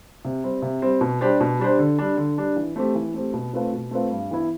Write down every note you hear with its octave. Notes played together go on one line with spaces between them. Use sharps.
C3
G3 C4
C3
G3 C4
B2
G3 D4 G4 C5
B2
G3 D4 G4 C5
D3
G3 D4
D3
G3 D4
E3
A3 C4 G4
E3
A3 C4 G4
B2
A3 C4 F4 B4
B2
A3 C4 F4 B4
G2
E3 B3 E4